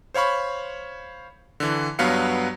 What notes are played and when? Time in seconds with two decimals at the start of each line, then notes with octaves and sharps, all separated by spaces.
0.14 C5 C#5 F5 B5 C#6
1.60 D3 E3
1.99 G2 F#3 B3 B4 F5 C#7